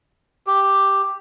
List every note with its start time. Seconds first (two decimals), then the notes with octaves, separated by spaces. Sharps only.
0.47 G4